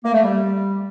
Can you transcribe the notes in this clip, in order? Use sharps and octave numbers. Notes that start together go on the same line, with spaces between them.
A#3
A3
G3